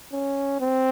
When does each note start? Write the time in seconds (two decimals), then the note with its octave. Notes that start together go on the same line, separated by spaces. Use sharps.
0.12 C#4
0.60 C4